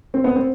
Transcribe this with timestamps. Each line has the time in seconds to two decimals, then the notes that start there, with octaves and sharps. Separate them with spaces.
0.14 C4
0.24 B3
0.36 C4